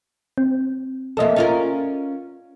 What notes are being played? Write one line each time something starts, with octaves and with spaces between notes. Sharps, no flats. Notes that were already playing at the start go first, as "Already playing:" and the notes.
C4
F2 A#3 A4 D#5 E5
C#4 F4 A#4